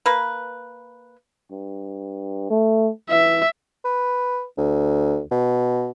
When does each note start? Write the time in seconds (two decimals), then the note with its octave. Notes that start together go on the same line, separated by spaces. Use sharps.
0.06 A#3 B4
1.52 G2
2.50 A3
3.10 E3 E5
3.85 B4
4.57 D2
5.31 B2